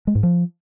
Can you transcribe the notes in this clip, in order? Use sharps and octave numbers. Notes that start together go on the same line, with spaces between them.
G#3
G#2
F3